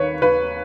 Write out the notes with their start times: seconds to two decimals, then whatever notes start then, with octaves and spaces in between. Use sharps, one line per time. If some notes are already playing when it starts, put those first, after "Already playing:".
Already playing: D#2 D#3 B4 C#5
0.22 D#2 B4